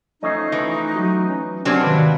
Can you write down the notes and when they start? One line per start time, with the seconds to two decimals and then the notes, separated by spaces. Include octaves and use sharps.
0.23 F3 A3 C#4 D#4 D#5 D#6 C7
0.52 E3
0.95 F#3 F#4
1.29 C#4
1.65 B2 F#3 C4 D4 G4 A#4 G#5 F6
1.84 G#2 C3 D#3 B4 F5